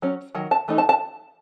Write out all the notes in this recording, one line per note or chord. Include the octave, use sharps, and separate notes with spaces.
F#3 C#4
D#3 F#3
A5
E3 A3 D#4
A5
A5